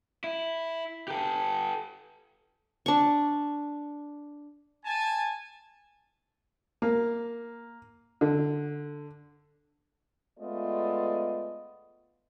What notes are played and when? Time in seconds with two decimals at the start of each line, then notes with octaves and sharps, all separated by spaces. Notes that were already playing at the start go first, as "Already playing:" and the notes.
0.24 E4
1.08 G4 A4
2.86 D4 C#6
4.85 G#5 A5
6.82 A#3
8.21 D3
10.39 G#3 A3 B3 F4 D5 D#5